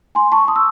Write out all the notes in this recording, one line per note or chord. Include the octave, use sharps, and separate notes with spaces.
G#5 C6
A5 C#6
C6 D#6
E6